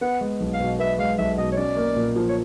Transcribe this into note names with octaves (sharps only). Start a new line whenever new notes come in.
B3 F#5
G#3
B1
F5
B2
B3 E5
G#3 F5
B1 E5
B2 D#5
C#5
C#4 D5
A#3
A#2
F3
C#5